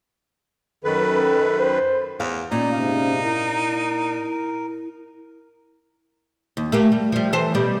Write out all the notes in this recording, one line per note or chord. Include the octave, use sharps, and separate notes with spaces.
F#2 D#3 A4 B4
C5
E2 F5
A#2 C#4 D#4 D5 A#5
G#2 C3 F5
E4 A#4
D#2
A3 A#3 G4
G3
F3 G3
E3 A4 C5
B2 G3